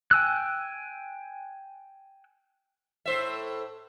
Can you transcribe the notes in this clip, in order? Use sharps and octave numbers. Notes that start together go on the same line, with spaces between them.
G5 G#5 E6 F#6
A2 C5 E5